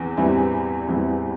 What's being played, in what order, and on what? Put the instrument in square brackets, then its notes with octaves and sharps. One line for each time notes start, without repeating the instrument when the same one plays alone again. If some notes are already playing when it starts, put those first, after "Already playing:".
Already playing: [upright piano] E2 E3 C4
E2 E3 G3 C4 E4
E2 E3 G3 C4 E4